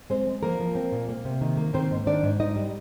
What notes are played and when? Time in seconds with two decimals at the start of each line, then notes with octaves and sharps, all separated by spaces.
0.10 G#3 C4 C5
0.27 G#3
0.43 F3 A#3 A#4
0.60 F3
0.75 C4
0.92 A#2
1.09 A#3
1.25 C3
1.41 D#3
1.57 A#3
1.74 D#3 C4 C5
1.91 G#2
2.07 D#3 D4 D5
2.23 G#2
2.40 G#2 D#4 D#5
2.56 G3